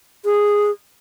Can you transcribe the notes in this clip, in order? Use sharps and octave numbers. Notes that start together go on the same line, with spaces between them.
G#4